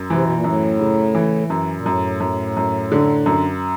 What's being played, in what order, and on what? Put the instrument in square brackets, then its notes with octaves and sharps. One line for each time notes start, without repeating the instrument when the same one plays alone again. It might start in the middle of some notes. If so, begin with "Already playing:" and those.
Already playing: [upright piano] F#2
[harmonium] C3 [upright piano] E3
[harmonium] B2
A#2
[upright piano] F#2 [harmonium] A2
[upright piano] C#3
E3
F#2
[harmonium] A#2
[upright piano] F#2 [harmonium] A2
[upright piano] F#2
F#2
D3
F#2